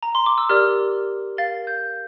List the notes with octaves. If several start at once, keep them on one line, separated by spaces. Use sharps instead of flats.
A#5
C6
D6
E6
G4 A#4 D5 F6
A#4 F5 A6
G6